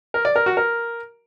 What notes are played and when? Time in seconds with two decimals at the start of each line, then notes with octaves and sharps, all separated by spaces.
0.14 A#4
0.25 D5
0.36 A#4
0.46 F#4
0.57 A#4